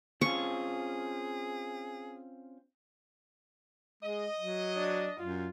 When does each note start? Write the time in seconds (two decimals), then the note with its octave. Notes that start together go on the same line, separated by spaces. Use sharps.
0.21 C4 C#4 F4 G#4 C#6
4.03 G#3 D#5
4.40 F#3
4.76 D4
5.20 F#2 F4